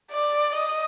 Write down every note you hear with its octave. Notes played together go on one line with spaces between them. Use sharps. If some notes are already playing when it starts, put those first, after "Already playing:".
D5
D#5